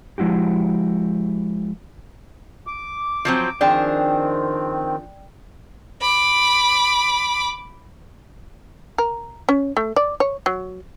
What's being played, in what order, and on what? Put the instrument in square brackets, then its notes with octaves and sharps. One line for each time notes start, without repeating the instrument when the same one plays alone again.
[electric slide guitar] F3 G#3 E4 F#4 G4
[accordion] D6
[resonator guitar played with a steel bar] F3 F#3 C4
[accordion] D#3 C4 [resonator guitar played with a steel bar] F3 D4 G#4 [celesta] D5 G5
[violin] B5 D6
[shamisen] A#4
C#4
A3
D5
C#5
F#3